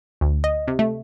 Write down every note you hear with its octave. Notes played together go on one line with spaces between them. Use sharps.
D2
D#5
C3
A3